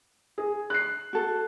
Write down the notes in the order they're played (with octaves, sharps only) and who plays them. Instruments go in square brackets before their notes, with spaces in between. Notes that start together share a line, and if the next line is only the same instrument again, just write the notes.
[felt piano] G#4
F#6 C7
[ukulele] F#4 A4